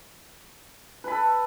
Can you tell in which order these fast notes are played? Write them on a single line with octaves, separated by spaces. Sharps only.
B4 B5 A4